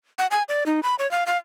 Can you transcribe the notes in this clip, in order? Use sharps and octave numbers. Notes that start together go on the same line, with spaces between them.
F#5
G#5
D5
D#4
B5
C#5
F5
F5